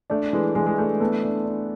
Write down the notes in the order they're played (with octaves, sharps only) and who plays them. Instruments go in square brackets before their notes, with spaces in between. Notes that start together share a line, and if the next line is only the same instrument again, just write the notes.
[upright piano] A3 [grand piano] D4
[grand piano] E3 [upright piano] G#3
[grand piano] E3 [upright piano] G#3
[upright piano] G#3
[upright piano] A3 [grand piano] D4
[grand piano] A3 [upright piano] B3
[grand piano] D4
D4